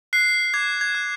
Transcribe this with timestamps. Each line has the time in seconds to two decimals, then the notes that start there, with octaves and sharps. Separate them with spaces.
0.13 F#6 C7
0.54 D6 G#6
0.81 G#6
0.95 F#6